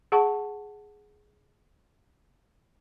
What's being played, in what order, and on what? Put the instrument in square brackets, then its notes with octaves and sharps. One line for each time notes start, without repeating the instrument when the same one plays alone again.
[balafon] G#4 F#5 A5 C#6